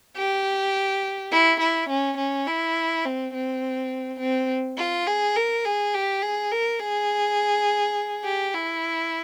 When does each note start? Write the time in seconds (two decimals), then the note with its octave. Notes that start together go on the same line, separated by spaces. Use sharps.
0.17 G4
1.32 E4
1.60 E4
1.89 C#4
2.18 C#4
2.47 E4
3.05 C4
3.34 C4
4.20 C4
4.78 F4
5.07 G#4
5.36 A#4
5.65 G#4
5.94 G4
6.22 G#4
6.52 A#4
6.80 G#4
8.24 G4
8.54 E4